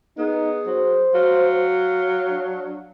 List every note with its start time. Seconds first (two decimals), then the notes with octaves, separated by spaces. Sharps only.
0.18 B3 D#4 G#4
0.66 F#3 C5
1.14 F#3 F5
2.30 D4